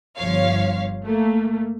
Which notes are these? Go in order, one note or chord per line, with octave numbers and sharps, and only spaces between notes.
G1 G2 F3 C#5 F5
A3 A#3